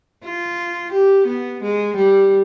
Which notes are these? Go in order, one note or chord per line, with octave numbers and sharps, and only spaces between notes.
F4
G4
B3
G#3
G3